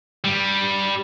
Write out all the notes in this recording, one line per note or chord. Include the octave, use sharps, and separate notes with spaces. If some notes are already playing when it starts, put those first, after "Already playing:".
G2 G3